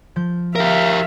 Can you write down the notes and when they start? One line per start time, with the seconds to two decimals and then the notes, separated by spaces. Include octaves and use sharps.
0.16 F3 G6
0.56 G4 A#4 E5 F5